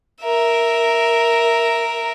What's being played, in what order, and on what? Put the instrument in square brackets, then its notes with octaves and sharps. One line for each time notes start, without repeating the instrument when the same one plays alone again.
[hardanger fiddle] A#4 E5